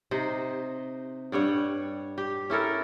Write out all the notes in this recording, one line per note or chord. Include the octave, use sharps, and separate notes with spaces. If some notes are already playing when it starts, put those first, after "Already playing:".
C3 D#4 C5
G2 G3 C#5 F#5
G4
C#4 E4 A4 A#4